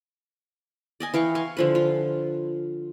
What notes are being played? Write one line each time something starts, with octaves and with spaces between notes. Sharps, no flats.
D5 D#5 G#5
E3 F5 G5 C#6
F5 G#5 C6 C#6
D3 F3 B4
F4